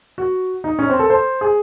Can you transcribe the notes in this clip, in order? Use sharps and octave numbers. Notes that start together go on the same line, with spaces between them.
F#4
D#4
C#4
C4
A4
C5
G#4